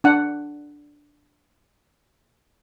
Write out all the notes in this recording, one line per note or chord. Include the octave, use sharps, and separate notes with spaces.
D4 F#5